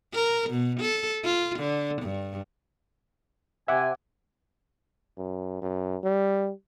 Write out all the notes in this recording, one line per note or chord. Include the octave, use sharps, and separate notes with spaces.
A#4
B2
A4
F4
D3
G2
C3 E5 F#5 G#5 D6
F#2
F#2
G3